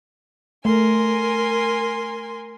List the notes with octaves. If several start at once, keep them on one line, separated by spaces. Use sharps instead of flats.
A3 A#4 G#5 C6